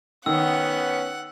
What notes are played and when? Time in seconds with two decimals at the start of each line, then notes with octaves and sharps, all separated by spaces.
0.26 D#3 B3 C#4 F#5 E6